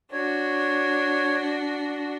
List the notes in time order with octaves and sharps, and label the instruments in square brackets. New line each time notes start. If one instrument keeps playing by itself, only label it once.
[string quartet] D4 F#4 [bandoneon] C#5